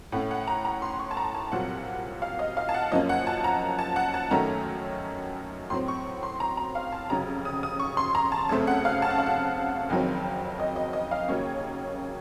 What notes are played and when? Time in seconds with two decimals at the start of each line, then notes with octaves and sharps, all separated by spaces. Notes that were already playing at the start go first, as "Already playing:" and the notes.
0.12 A2 A3 C#4 F#5
0.31 F#5
0.47 A#5
0.65 A#5
0.82 C6
1.00 C#6
1.11 A5
1.17 A#5
1.34 A5
1.52 C2 A#2 F#3 C4 F#5
2.22 F5
2.39 D#5
2.57 F5
2.69 A5
2.74 F#5
2.92 F#2 F3 A#3 C#4 D#5
3.09 F#5
3.27 A5
3.44 A#5
3.79 A5
3.96 F#5
4.14 A5
4.31 F#2 D#3 F#3 A3 C#4 A#5
5.70 A2 F#3 C4 C6
5.88 C#6
6.23 C6
6.40 A#5
6.57 A#5
6.75 F5
6.92 A5
7.10 F1 F2 C#3 F#3 A#5
7.45 D#6
7.63 D#6
7.79 C#6
7.97 C6
8.15 A#5
8.32 A5
8.49 F#2 C#3 A3 C4 A5
8.67 F#5
8.85 F5
9.02 A5
9.10 F#5
9.18 F5
9.26 F#5
9.89 F#1 F2 D#3 F#3 C4
10.60 D#5
10.76 D#5
10.93 D#5
11.11 F5
11.28 D#2 C#3 F#3 A#3 C#4 C#5